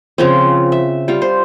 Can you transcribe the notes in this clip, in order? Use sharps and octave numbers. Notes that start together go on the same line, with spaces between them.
C#3 F3 C4
E5
G3 F4
C5